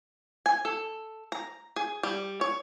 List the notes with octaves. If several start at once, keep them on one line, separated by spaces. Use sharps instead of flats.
G#5
A4
A#5
G#4
G3
C#5